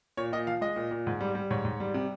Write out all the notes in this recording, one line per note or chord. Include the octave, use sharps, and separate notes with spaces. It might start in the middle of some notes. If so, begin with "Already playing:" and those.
A#2 C#5
A#2 D#5
F3 F5
G#3 D#5
A#2
A#2
G#2
G3
G3
G#2 C#5
G#2
G3
C3